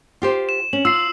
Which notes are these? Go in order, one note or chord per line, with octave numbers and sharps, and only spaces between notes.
F4 G4 C5
E7
C#4 F#7
F4 E6 C7